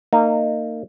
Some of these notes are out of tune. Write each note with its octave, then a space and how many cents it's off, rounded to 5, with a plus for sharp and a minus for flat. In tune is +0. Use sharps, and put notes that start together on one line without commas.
A#3 -30 D#4 -20